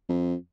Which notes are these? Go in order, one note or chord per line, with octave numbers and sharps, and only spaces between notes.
F2